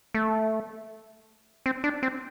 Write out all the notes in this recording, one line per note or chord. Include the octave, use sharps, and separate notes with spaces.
A3
C4
D4
C4